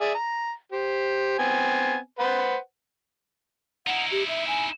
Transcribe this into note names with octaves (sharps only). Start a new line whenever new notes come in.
G#4 D5 E5
A#5
G4 C5
B3 C4 G#5
B4 C5 F#5
D#4 E4 F#5
G4
E5
G#5